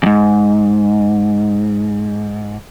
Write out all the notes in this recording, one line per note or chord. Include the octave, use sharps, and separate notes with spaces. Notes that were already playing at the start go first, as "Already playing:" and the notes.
F2 G#2